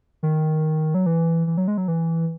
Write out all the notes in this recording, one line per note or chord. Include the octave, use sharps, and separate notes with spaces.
D#3
F#3
E3
E3
F#3
G#3
F#3
E3